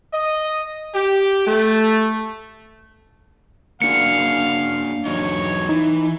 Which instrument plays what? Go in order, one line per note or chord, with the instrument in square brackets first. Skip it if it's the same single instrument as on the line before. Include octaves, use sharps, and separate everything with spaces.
[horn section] D#5
G4
A3
[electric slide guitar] A#3 F#4 G#4 [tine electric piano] D4 C#7 [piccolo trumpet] F5
[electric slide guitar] E2 F#3 D#4 [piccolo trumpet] C#5
[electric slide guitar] E3 [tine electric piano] D#4